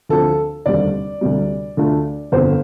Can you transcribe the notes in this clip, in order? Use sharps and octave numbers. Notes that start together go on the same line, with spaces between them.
D2 D3 F3 C4 A4
F1 D#2 D3 G3 C4 D5
D2 C3 G3
D2 D3 A3 D4 F4
G1 F2 D3 C5